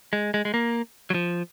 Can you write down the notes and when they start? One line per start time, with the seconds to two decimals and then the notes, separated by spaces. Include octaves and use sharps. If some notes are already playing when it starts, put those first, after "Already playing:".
0.13 G#3
0.34 G#3
0.45 G#3
0.54 A#3
1.10 F#3
1.14 F3